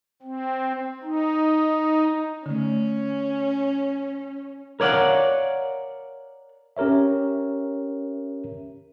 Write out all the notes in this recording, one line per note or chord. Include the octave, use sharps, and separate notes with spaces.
C4
D#4
D3 A3 C#4
A#4 C#5 D5 F5 F#5
C#4 G4 A#4 C#5 E5